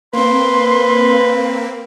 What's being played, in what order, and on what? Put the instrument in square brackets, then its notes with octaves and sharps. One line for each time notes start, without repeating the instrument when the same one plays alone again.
[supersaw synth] A#3 C4 [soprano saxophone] B4 [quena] C6